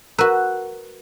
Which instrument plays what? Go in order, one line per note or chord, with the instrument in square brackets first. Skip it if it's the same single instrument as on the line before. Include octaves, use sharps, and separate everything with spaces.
[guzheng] F#4 B4 [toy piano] A#4 A#5